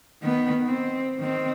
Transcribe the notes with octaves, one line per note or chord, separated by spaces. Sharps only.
D#3 B3
C4
D#3 C4